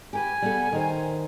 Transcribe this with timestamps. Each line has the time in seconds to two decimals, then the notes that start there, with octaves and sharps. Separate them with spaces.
0.13 G4 A#4 B4 G#5
0.42 G3 B3 A4
0.72 D#3 A#4 C5